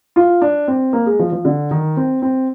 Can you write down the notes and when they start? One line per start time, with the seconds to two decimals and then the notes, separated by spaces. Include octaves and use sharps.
0.16 F4
0.42 D4
0.68 C4
0.93 A#3
1.06 G#3
1.19 F3
1.32 F3
1.45 D3
1.71 D#3
1.97 C4
2.22 C4